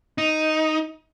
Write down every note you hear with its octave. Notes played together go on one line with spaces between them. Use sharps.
D#4